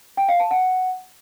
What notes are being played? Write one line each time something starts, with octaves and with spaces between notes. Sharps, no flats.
G5
F5
A5
F#5